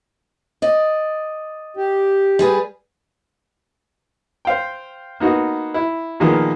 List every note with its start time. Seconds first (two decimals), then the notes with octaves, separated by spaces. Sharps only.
0.62 D5 D#5
1.77 G4
2.39 G3 G#4 B4
4.45 C5 F5 G5
5.20 A#3 B3 D#4 F#4
5.74 E4
6.20 A#2 D#3 F3 G#3 A#3 B3